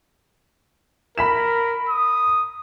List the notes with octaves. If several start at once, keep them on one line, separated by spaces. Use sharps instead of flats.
A#4 B5 B6 E7
D#6